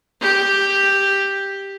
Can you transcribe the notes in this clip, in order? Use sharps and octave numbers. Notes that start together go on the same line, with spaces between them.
G4